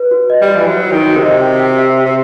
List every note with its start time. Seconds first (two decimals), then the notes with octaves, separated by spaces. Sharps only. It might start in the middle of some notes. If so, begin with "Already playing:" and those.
Already playing: B4
0.11 F#4
0.30 D#5
0.42 G3
0.48 F#4
0.56 E3
0.67 F#3 F#4
0.86 F#4
0.92 D#3
1.04 F#4
1.17 C3
1.22 D#5
1.41 G5
1.60 G5
1.78 E5
1.96 E5
2.06 C3